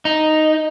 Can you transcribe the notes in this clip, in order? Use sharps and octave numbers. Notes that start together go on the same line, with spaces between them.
D#4